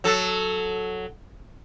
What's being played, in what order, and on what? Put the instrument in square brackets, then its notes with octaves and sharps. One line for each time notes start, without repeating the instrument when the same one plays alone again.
[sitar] F#3 A4